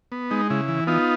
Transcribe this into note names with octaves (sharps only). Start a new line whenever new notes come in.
B3
G#3 D#4
C#3 E4
E3
B3 D#4 F4